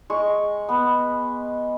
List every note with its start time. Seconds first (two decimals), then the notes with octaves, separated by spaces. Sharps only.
0.10 G#3 C#6
0.69 B3